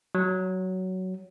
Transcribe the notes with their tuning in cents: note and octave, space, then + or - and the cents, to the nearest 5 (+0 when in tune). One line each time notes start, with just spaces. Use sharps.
F#3 +10